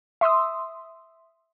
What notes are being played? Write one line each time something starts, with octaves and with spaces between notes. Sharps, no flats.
E5 C6 D#6 E6